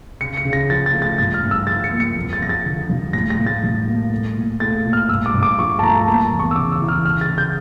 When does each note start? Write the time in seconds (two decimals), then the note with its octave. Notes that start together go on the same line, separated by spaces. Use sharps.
0.21 C#3 C#7
0.37 C#7
0.45 C#3
0.53 A#6
0.70 F3 A6
0.86 A6
0.94 A3
1.02 A6
1.18 G2 A6
1.34 F6
1.43 G2
1.51 E6
1.67 F3 A6
1.84 C#7
1.92 A#3
2.00 C#7
2.16 F2
2.33 A6
2.41 F2 A#6
2.49 A6
2.65 D3
2.90 G3
3.13 A2 A#6
3.30 A#6
3.39 A2
3.46 A6
3.63 G3
3.87 A#3
4.12 A3
4.36 A#2
4.60 A3 A6
4.85 A#2
4.93 F6
5.09 G2 E6
5.26 D6
5.34 G2
5.43 D6
5.58 F3 C#6
5.79 A5
5.82 A3 A#5
6.07 A#3 A5
6.31 E2
6.39 C#6
6.51 E6
6.56 C#3 D6
6.72 E6
6.81 E3
6.88 F6
7.05 C#3 F6
7.21 A6
7.29 C#3
7.38 G6